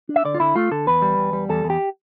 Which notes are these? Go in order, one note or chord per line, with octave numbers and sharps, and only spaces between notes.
D4
E5
D3 D5
F4
D3 E4
A3 F4
D3 A4
E2 B4
G3
E2
G3
E2 A4
E2
G4